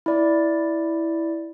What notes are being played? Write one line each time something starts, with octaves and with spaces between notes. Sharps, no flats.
E4 D5